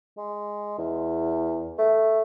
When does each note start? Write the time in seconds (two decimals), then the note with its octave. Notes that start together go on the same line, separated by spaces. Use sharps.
0.17 G#3
0.78 E2
1.78 A3